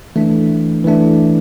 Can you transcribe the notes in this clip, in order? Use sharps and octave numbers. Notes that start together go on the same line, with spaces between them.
E3 A3 D4
E3 A3 D4